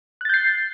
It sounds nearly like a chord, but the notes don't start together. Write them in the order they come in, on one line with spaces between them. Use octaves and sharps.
F#6 A6 G6 C7